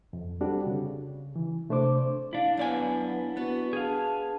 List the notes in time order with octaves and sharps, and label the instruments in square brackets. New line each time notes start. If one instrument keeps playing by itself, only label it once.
[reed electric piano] F2
G3 C4 D4 F#4 G4 A4
C#3
E3
C3 A3 D4 C5 D6
[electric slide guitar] D4 E4 [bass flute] F5
[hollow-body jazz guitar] F#2 D5 G#5 [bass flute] B3
[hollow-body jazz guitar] B3 [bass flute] F#4
[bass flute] D4 [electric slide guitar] G#4 F5